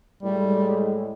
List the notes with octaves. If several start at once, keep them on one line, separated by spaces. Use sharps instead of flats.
A2 G3 G#3